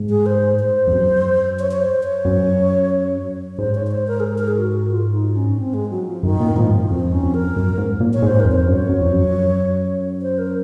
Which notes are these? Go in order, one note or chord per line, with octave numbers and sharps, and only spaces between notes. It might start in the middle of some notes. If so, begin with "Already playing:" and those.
Already playing: G#2
G#4
C5
C5
F2
F#2
C#5
C#5
C5
C#5
F#2
G#2 C5
C#5
C#5
C5
A#4
G#4
A#4
A#4
G#4
F#4
F4
D#4
C#4
C4
G#3
F#3
F3
F#2 D#3
A#2
G#2 F3
F#2
F2 C4
C#4
F2
A#4
F#2
G#2
A#2
C#5
G#2 C5
A#4
F2
C#5
C5
F#2
C#5
F#2
F2
F#2
C5
A#4